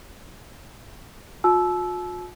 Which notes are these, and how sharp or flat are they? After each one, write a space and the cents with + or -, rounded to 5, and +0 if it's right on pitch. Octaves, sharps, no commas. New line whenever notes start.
F4 +45 A5 -35 E6 +0